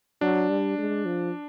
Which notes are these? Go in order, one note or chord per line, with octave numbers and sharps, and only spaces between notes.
F#3 D4
G3
G#3
F3